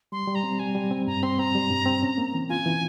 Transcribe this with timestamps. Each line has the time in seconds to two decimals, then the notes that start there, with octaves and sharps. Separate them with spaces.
0.12 G3 C6
0.27 G3
0.35 A#5
0.43 C4
0.59 G3 G#5
0.75 G3
0.91 C4
1.07 G2 A#5
1.23 C4 C6
1.39 C4 A#5
1.55 G3
1.70 G2
1.86 C4
2.03 C#4
2.18 A#3
2.34 E3
2.49 F4 G#5
2.66 E3